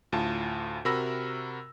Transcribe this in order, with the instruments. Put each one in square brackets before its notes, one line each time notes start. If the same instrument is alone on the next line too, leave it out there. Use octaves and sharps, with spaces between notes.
[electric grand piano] D2 A2 F4 A5
C3 F#4 A#4 B5 E6 A#6